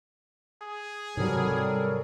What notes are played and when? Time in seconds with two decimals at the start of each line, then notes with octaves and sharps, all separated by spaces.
0.63 G#4
1.17 G#2 C3 F#3 G3 A4 A#4 C#5